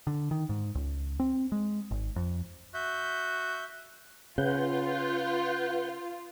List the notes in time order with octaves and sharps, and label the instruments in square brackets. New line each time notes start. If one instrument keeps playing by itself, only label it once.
[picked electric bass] D3
D#3
G#2
C#2
C4
G#3
G#1
F2
[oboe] F#4 [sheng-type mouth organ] E5 G6
[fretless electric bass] C#3 [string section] F4 [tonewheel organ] B4 F#5 G6